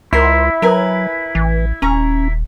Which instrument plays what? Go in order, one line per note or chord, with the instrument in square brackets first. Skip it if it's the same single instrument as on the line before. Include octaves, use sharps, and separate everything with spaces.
[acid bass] C#2 [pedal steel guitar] E4 [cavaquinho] A#4 C5 C6
[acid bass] F#3 [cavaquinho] A#4 B4 G#5
[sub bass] A1 [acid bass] E3
[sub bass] D#1 [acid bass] C#4 [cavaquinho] A#5 C#6